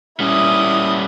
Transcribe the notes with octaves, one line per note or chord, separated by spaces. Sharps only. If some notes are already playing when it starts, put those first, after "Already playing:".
G3 C#4 E4 D#6